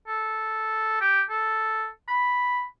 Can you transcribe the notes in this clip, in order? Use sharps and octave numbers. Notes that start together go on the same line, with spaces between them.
A4
G4
A4
B5